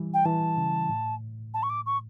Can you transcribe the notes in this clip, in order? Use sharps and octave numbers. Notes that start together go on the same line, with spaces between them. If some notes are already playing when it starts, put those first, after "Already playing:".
Already playing: E3 G3
G5
E3 A5
C#3
A2
A5
C#6
D6
C#6